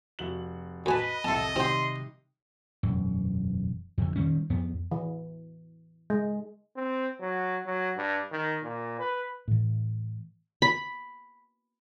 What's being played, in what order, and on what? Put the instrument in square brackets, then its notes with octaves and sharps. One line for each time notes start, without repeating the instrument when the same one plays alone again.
[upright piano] F1 F#4 F#7
[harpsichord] D2 G#5 A5 [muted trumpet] B4 [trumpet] D#5
[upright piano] C2 F2 [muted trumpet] A4 [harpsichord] A5 C6
[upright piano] C3 D#3 G3 [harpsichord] C4 G5 [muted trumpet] C6
[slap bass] E1 F#2
F2 D3
D#3 G3 C#4
F2 B3
[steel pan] E3
G#3
[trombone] C4
F#3
F#3
G2
D#3
A#2
B4
[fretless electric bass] A2 E3
[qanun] B5